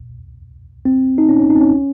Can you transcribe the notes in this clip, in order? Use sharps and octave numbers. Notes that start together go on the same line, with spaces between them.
C4
D#4
C#4
C#4
D#4
C4
C#4